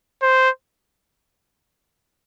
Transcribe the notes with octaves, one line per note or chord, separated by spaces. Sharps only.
C5